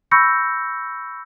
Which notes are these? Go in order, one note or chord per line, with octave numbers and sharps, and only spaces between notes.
B5 C#6 E6 G6 A#6 C#7